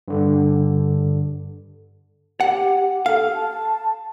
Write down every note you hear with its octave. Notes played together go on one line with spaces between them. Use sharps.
G2 D3
G4 F#5
A4 F5
A5